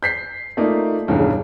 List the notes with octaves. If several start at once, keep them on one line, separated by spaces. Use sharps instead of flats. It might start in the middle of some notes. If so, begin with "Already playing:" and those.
G6 B6 C7
A3 A#3 D#4 F4 D5
E1 B1 E2 G2 C#4